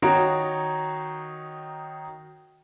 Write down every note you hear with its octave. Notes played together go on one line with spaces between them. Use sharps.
D#3 D#4 F#4 C#5 A#5 D7